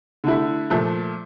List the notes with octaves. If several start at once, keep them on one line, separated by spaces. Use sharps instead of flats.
D3 A3 E4
A#2 F3 A3